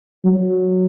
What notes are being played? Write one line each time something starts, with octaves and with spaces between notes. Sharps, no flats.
F#3